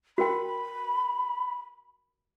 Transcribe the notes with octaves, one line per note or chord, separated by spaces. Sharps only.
F#4 A#4 G5 B5